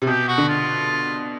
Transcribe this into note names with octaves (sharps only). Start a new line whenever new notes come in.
C3
B2 G4
F#4
D3
F4